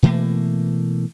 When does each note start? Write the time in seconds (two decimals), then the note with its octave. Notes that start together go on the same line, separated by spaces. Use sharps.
0.03 B2 E3 A3 A#3